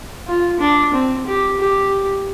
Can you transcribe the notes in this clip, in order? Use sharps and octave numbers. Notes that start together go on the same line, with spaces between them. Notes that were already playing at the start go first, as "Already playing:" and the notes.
F4
D4
C4
G4
G4